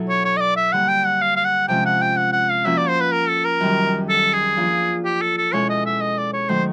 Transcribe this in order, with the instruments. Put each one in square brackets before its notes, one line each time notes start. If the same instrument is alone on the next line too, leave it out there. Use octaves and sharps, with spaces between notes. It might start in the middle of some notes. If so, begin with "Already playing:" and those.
Already playing: [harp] B2 F#3 B3 E4 A4
[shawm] C#5
C#5
D#5
D5
E5
[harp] D3 G3 A#3 [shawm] F#5
[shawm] G5
F#5
F5
F5
F#5
[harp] C3 F3 G#3 C#4 [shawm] G5
[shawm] F#5
G5
F#5
F#5
F5
[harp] F3 A#3 C#4 F#4 [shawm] E5
[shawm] D5
C5
B4
A#4
A4
A#4
[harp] F#2 D#3 G3
[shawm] A4
G#4
[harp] F3 A#3 D4 F4
[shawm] G4
A4
A4
[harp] B2 G#3 C#4 E4 A4 [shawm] C#5
[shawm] D#5
E5
D#5
D5
C#5
[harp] D#3 F#3 A3 [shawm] C5